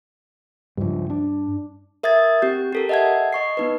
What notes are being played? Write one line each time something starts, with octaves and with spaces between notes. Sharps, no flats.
C#2 G2 F3
D4
A#4 E5 D#6 G#6 A6
C4 G4 G6
G4 A4 A#4
D#5 E5 F#5 A5 G#6
D#5 C#6 C7
B3 D#4 B4